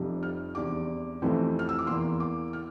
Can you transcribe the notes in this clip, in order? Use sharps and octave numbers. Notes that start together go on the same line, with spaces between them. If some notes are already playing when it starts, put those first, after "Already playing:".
Already playing: F1 F2 C3 G3
F6
E2 C3 G3 D4 D6
F2 C3 E3 A3 C4
F6
E6
D6
E2 E3 A#3 C6
D6
F6